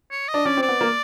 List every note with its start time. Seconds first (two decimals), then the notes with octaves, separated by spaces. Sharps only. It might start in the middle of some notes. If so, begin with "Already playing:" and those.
0.11 C#5
0.28 D#5
0.34 D4
0.45 C#4 D5
0.57 C4
0.63 D5
0.68 B3
0.81 A#3